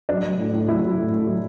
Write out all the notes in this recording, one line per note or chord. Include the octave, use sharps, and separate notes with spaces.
F#3 D4
F#3
A2
A2
F#3 E4
F#3
A2
A2
F#3